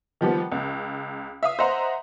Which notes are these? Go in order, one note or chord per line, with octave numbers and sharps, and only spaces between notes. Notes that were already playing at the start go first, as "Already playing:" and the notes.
D#3 F3 G3 B3
C#2
E5 F5 D#6
C5 D#5 E5 F#5 A#5 C6